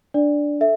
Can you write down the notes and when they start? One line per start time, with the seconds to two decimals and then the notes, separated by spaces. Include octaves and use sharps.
0.14 D4 D5
0.61 A4 E5